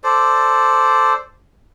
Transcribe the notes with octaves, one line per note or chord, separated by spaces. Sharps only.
A4 C5 D5